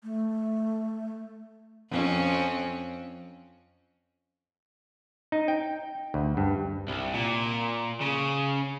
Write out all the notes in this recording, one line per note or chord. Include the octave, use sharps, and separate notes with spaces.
A3
F2 C4 C#4
D#4
G5
D2
G2
C2
A#2
C#3